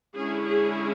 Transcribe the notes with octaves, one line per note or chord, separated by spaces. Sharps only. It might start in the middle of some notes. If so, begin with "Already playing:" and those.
D3 G#3 C#4 E4 G#4
G#4